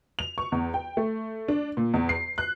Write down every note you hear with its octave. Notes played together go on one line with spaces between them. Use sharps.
F7
C#6
E2
G5
A3
D4
A#2
E2
C7
F#6